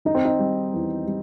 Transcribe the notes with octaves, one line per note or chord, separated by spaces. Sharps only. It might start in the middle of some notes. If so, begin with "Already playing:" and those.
D#3 D#4
C4
D#4
G3
E2
G3